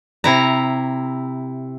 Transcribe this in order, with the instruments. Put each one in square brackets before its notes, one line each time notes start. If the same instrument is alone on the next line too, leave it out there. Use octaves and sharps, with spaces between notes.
[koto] C3 E4 A#5